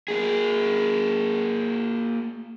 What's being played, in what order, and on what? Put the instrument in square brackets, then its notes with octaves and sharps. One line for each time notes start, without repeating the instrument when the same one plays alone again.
[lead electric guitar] A#3 G#4